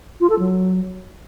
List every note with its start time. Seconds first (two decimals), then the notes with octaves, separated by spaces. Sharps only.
0.20 F4
0.30 A4
0.39 F#3